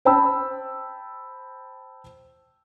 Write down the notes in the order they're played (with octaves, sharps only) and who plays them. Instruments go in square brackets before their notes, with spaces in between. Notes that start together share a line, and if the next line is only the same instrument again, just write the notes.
[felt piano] C5 G5 A5 B5 E6